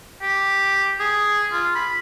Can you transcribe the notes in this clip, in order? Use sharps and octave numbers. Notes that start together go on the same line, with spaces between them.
G4
G#4
F4
B5